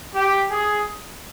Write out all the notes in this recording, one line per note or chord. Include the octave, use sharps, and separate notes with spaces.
G4
G#4